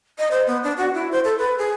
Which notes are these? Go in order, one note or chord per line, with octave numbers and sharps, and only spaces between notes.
D#5
C5
B3
D4
F#4
E4
C5
A4
B4
G#4